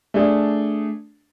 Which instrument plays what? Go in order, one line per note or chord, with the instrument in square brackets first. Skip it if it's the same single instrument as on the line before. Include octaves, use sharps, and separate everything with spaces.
[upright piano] A3 D4 G#4